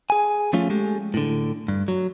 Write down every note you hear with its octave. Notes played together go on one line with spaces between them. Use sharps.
G#4 G#5
F3 A3 C#4 F4
G#3 A3 G4
A2 D3
G2
F#3